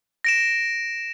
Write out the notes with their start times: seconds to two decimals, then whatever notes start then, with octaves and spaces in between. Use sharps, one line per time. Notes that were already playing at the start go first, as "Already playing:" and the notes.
0.24 A#6 D7 E7